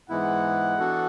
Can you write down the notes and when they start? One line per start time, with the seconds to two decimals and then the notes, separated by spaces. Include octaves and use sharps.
0.10 G#2 E3 G#3 B3 E4 F#5
0.78 E3 B3 D4 F#4 A4